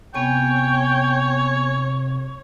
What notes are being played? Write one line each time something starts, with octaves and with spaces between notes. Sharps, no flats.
C3 B3 C#5 G5 G#5 C#6